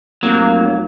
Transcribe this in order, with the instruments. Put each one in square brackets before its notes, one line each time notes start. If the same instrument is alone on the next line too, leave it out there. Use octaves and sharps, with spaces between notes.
[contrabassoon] F1 [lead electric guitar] F#3 [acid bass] A#3